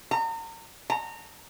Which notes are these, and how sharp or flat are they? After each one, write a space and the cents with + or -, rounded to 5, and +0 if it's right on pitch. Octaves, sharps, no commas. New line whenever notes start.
A#5 -35
A#5 -25